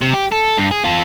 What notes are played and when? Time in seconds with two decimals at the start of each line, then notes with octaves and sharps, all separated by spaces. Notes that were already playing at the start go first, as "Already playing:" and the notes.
0.01 C3
0.13 G4
0.32 A4
0.57 G2
0.71 G#4
0.84 F4 A4